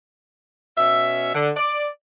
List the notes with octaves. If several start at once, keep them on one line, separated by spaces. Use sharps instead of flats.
B2 C#4 E5
D3
D5